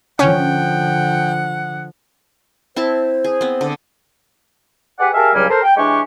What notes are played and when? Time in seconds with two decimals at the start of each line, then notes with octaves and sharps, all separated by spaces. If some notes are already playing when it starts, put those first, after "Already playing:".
0.19 D3 F3 C#4 F#5 G5
2.76 C4 E4 C5 A5
3.24 G#4
3.41 B3 C4
3.61 D3
4.99 G4 G#4 B4 D5 F#5
5.14 G4 G#4 A#4 E5 F5 A5
5.34 C#2 G2 F#3 G3 G#5 F6
5.49 A4 A#4 C5
5.63 G5
5.77 E3 G#3 D4 G4 C#5 C#6